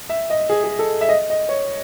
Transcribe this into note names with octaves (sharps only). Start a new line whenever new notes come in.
E5
D#5
G#4
G#4
A4
E5
D#5
D#5
C#5